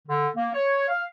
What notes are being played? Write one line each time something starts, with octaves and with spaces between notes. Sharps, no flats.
D3
A#3
C#5
F5